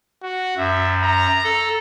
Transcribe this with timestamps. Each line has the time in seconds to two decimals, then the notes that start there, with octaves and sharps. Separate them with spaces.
0.23 F#4
0.57 F#2 E5
1.03 A#5
1.44 A4